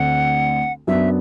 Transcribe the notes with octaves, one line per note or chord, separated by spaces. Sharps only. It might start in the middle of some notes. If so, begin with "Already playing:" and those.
Already playing: D2 D3 A3 C4 F#5
F#2 F#3 B3 D4 E5